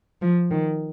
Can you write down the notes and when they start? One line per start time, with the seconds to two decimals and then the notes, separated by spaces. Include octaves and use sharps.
0.22 F3
0.51 D#3